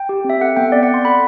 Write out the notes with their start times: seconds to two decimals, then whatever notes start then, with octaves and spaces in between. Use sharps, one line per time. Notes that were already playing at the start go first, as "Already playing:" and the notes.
Already playing: G5
0.09 G4
0.24 C4
0.30 E5
0.41 A4 F#5
0.56 B3 G5
0.72 C4 D5
0.83 F#5
0.89 C4 C6
1.05 A4 B5